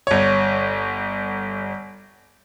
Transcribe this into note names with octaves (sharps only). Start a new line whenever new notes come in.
G1 C#5